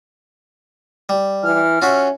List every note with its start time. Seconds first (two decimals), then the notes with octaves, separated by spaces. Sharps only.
1.09 G3
1.43 E3 F6
1.82 C#4 F4 F#4 E5